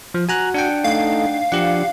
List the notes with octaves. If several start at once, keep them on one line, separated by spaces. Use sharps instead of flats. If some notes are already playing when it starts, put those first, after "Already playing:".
F3
F#4 G#5 A#5 F#6
D4 F#5 G5
A3 D#4 F5
F3 D4 G4 F#5